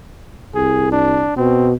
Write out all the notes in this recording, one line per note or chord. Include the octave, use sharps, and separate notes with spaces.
C2 G#4
D4
B2 C4